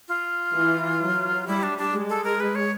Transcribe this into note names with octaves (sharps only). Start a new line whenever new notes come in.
F4
E3
F#3
G3 E4
D4
D4
G#3
A4
A#4
B4
C#5